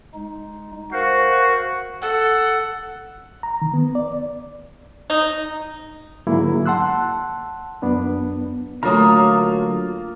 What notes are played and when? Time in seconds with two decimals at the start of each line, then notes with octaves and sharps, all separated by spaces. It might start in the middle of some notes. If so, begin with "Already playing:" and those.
0.14 G#3 D#4
0.92 F#4 A#4 C5 F5
2.02 A4 F#5
3.43 A#5
3.62 D#3
3.74 B3
3.95 D5
5.10 D#4
6.27 G#2 D3 F#3 A#3 E4 G#4
6.66 F#5 A5 C6 E6 F#6
7.82 F#2 B3 D4
8.83 D3 F#3 A3 A#3 F4 A#5 D#6